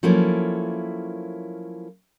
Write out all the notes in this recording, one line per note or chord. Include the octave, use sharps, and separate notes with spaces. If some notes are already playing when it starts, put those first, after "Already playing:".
F3 F#3 A3 A#3 C#4 E4